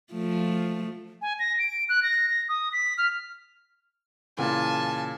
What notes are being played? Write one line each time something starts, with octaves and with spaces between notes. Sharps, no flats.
F3 A3
G#5
A#6
D7
F#6
A#6
A#6
D#6
B6
F6
A#2 C#3 E3 G#5 A5